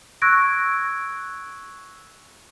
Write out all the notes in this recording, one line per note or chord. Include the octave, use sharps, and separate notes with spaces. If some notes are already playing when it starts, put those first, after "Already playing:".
C#6 E6 F#6 G#6 A#6 D7